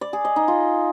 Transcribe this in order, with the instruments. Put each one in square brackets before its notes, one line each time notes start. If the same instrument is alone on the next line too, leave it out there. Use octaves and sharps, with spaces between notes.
[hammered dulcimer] D5
G#4
D#5
D#4
F4